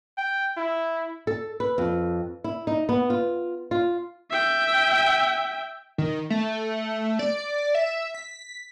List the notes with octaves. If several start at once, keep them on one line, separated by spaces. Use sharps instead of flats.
G5
E4
A4
B4
F2
E4
D#4
B3
F4
F4
E5 G5
D#3
A3
D5
E5
B6